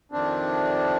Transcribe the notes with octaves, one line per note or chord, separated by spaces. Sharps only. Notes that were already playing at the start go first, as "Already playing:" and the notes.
F2 C3 D#3 C4 D4